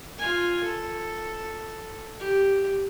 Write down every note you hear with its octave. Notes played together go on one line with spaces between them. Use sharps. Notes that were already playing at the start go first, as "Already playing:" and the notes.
F4 G#5
A4
G4